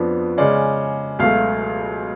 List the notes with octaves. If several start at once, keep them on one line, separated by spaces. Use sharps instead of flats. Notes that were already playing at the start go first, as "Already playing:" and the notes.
Already playing: F2 F3 B3 D4
C#3 G#3 C#4 D5
C#2 B2 F#3 A3 F5